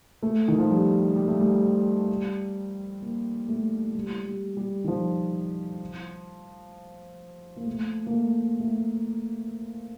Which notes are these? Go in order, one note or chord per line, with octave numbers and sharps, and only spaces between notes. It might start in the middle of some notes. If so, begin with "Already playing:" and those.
A3
D#3
F3
G3
G3
A3
G3
A#3
A3
G3
G3
G3
D#3
F3
A#3
A3
A#3
A3
A3